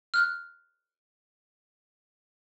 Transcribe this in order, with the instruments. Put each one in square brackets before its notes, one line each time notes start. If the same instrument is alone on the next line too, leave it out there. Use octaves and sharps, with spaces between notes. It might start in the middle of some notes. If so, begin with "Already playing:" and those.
[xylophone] F6 F#6